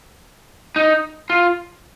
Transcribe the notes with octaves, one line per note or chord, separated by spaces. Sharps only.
D#4
F4